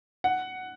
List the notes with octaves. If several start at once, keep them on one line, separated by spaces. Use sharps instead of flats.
F#5